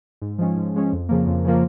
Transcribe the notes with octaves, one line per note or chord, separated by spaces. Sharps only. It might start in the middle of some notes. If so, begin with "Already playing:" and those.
G#2
F3 G#3 C#4
G#2
F3 G#3 C#4
F2
C#3 F3 A#3
F2
C#3 F3 A#3